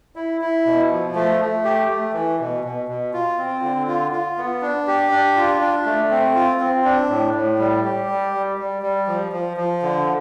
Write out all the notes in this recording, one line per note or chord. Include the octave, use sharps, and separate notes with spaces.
E4
E4
B2
F3
A3
A3
G4
A3
E3
B2
B2
B2
F4
C4
D3
F4
F4
B3
D4
G4
D4
F4
D4
A3
C4
F4
C4
D4
A2
A2
G3
G4
G3
G3
G3
G3
F3
F3
F3
D3